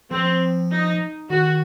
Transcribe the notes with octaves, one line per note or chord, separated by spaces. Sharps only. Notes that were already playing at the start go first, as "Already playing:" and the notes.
F3 C4
D#4
D#3 F#4